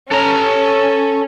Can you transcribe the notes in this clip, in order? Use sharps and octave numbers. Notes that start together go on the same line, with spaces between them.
C#4 A4 A#5